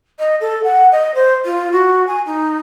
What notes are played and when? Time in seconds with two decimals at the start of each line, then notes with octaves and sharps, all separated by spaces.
0.19 D#5
0.41 A4
0.64 F#5
0.92 D#5
1.15 C5
1.45 F4
1.72 F#4
2.07 G#5
2.26 D#4